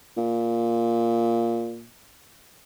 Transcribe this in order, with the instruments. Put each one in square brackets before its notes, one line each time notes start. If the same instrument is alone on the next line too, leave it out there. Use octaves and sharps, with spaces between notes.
[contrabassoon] A#2